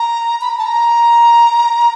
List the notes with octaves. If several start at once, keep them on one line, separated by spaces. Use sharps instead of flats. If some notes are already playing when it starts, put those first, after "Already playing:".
Already playing: A#5
B5
A#5
A5
A#5